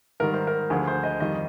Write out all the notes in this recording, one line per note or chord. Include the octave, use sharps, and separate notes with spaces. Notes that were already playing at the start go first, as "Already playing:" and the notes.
G#2 D#3 G3 A#4
C5
A#4
D2 D3 F3 G#4
C5
D#5
F2 D#3 G3 D#5